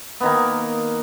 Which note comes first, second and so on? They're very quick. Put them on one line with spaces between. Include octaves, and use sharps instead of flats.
B3 D#3 A#3